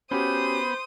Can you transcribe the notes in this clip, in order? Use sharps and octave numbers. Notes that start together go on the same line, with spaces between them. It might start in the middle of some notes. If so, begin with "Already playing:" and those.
B3 C#4 F#4 G4 C5 D#6